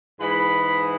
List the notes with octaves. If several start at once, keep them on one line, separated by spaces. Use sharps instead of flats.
G#2 E3 G#3 B5